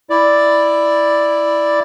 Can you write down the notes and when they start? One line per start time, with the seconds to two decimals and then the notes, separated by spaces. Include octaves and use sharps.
0.10 E4 D5